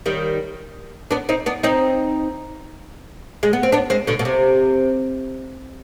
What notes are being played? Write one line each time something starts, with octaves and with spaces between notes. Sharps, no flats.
D#3 G3
B3 D4
C4 D#4
B3 D4
C4 D#4
G#3
B3
C4
B3 D4
G#3 C4
B2 D3
B2
C3